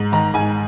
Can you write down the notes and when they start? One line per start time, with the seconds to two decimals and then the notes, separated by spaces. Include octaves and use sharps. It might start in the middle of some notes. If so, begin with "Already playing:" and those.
Already playing: G#2
0.12 D#3 A#5
0.34 G#2 G#5